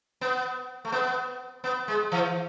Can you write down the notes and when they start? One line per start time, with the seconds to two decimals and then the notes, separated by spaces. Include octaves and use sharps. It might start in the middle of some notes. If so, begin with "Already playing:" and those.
0.21 B3
0.85 A3
0.92 B3
1.64 B3
1.88 G#3
2.12 E3